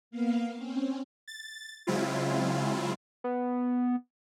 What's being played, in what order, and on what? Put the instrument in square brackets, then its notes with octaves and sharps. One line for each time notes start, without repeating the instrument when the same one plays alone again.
[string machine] A#3 B3 F5
C4 C#4
[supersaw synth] A6
C#3 F#3 G#3 C4 E4 F4
[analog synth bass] B3